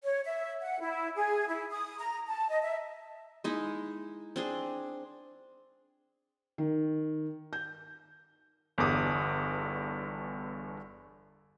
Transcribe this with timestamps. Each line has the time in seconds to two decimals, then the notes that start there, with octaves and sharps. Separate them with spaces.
0.04 C#5
0.25 E5
0.62 F#5
0.81 E4
1.16 G#4
1.48 E4
1.71 D#6
1.99 A#5
2.28 A5
2.49 D#5
2.62 E5
3.44 G#3 D#4 E4
4.36 C4 D4 G#4
6.58 D#3
7.53 G6
8.78 G1 E2 G2 D6 D#6